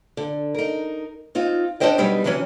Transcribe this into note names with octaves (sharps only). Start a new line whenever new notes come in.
D3
D#4 A#4
C4 D#4 F4
C#4 D4 G#4 C5 D#5 G5
B2 F#3 G3 B3 D#4
C3 D#3 E3 F#3 C#4